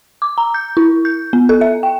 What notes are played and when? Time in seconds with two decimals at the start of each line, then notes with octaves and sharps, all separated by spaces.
0.22 D6
0.38 A#5
0.54 G6
0.77 E4
1.05 G6
1.33 B3
1.49 A4
1.61 E5
1.83 G5